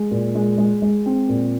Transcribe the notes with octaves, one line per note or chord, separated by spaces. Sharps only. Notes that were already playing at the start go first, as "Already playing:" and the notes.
Already playing: G#3
A#2
G#3
G#3
G#3
C4
A#2